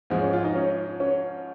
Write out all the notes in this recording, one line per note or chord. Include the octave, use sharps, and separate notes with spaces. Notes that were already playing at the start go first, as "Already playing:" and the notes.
G#2 F3 G#3 C4
C#4
F4
D#4
C#4
C#4